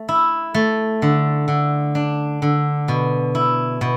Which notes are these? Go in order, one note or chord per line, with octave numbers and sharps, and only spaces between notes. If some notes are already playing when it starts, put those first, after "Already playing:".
Already playing: A3
E4
A3
D3
D3
D4
D3
B2
E4
B2